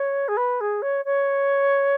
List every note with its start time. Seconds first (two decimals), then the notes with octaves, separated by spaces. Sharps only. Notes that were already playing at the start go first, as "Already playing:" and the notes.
Already playing: C#5
0.28 G#4
0.37 B4
0.61 G#4
0.82 C#5
1.05 C#5